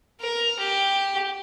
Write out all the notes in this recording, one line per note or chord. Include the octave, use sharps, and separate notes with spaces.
A#4
G4